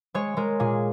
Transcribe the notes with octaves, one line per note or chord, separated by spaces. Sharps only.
G#3 C#5
G#3 A#4
A#2 G#4